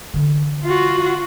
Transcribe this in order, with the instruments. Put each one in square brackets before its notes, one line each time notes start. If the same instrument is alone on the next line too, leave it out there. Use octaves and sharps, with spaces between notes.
[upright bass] D3 E3
[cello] F4 F#4